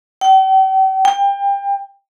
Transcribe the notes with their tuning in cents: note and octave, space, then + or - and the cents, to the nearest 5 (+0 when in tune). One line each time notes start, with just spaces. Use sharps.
G5 -45
G5 +30